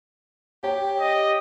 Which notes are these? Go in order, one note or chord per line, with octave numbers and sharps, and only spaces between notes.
G4 C#5 G5
D#5